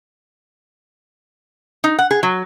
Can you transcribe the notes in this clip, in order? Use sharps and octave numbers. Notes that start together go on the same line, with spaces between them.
D#4
F#5
G#4
F#3